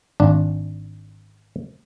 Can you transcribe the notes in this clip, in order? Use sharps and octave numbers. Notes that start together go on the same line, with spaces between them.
G#1 D4